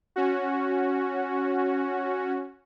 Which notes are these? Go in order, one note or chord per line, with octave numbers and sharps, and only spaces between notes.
C#4 F#4